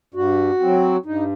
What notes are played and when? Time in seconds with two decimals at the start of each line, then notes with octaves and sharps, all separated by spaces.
0.14 G2 F#4
0.60 F#3 C4
1.06 G2 D#4